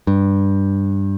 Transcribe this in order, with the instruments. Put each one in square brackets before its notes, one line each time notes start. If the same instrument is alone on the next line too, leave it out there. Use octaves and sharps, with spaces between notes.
[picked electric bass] G2